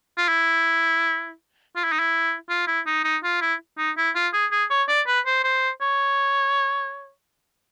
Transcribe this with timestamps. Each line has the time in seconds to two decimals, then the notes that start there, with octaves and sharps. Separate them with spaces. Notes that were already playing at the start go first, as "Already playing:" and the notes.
0.17 F4
0.28 E4
1.76 F4
1.84 E4
1.92 D#4
1.99 E4
2.50 F4
2.67 E4
2.86 D#4
3.04 D#4
3.24 F4
3.41 E4
3.78 D#4
3.97 E4
4.15 F4
4.33 G#4
4.52 G#4
4.70 C#5
4.88 D5
5.07 B4
5.26 C5
5.44 C5
5.81 C#5